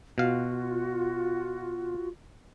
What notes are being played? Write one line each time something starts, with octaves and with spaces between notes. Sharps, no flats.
B2 F4 F#4 F5